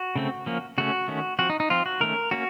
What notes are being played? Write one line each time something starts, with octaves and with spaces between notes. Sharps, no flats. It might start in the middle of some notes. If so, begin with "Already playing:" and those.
Already playing: F#4
C#3 A3 C4
F3 A#3 C#4
C#3 A3 C#4 F#4
D#3 A3 C#4
F3 C4 F#4
D#4
D#4
F3 C4 F4
F#4
D#3 A3 C#4 A#4
A#3 C#4 F#4